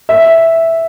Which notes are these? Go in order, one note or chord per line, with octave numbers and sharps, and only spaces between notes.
E5